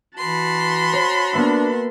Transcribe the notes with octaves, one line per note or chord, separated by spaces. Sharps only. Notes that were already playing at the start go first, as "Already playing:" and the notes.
E3 F#4 A5 B5 C6
C#5
A#3 B3 D4 E5